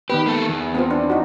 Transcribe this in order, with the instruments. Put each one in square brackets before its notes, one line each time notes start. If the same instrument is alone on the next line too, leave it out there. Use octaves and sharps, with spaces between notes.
[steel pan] D#3 B3 B4 [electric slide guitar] G4
[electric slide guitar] A#3 A4
E2
[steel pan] B3 C4 F4
D4
D#4 F#4